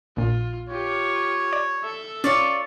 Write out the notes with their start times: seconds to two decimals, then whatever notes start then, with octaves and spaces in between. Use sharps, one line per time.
0.17 A#1 A#2 F4
0.69 F4 G4 C#5
1.53 D5
1.83 A4 E5
2.24 C#4 F4 C#5 D5